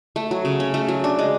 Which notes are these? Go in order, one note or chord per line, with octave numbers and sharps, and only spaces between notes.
A3
F#3
C#3
C#4
A3
F#3
D4
G#3